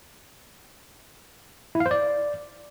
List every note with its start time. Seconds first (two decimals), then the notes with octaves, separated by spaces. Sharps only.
1.75 E4
1.80 F5
1.86 C5
1.91 D5